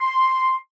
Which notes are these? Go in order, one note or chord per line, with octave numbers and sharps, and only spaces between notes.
C6